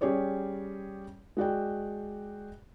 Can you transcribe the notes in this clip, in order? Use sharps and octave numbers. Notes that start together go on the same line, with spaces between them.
G3 C#4 G4 G#4 C#5 D5
G#3 F#4 D5 G5